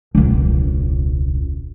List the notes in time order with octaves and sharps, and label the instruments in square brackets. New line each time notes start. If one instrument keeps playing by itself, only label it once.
[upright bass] E1 C#2